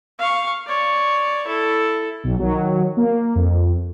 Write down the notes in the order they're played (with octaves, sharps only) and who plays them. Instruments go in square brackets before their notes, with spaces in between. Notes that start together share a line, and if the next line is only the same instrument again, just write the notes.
[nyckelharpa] F5 C#6
C#5 D5
E4 A4
[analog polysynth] B1
D#3 F#3
A#3
F2